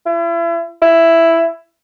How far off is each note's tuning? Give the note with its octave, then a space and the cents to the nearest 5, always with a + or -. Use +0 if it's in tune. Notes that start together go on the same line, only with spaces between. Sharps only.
E4 +40
E4 +5